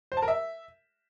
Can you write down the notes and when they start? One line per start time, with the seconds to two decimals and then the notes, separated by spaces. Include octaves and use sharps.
0.12 C5
0.17 A5
0.22 A#4
0.28 E5